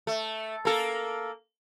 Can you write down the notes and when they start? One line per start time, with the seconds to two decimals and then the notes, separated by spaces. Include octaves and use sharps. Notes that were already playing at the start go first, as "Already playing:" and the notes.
0.07 A3
0.65 A#3 A4